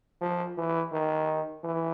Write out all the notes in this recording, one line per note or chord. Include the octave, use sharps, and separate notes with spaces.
F3
E3
D#3
E3